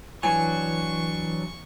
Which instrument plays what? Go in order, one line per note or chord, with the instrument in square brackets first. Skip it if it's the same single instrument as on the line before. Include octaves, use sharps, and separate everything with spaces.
[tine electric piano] E3 [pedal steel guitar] F#3 D4 F#4 [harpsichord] G#5 [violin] C#6